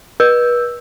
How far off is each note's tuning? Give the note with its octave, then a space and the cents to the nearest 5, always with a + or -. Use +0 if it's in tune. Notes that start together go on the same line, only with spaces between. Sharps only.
B4 -35 E6 +0